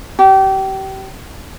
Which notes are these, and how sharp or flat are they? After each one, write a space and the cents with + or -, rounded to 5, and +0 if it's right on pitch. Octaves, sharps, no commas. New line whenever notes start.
G4 -30